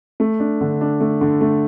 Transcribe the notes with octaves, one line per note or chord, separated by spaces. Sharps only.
A3
D4
D3
D4
A3
D3
A3